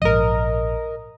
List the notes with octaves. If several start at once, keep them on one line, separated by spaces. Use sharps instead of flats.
A#1 G#2 F3 A#4 D#5